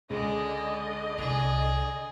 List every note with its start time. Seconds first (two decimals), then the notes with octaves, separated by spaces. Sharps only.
0.10 C#2 D3 G#3 D5 D#5
1.18 C2 G#4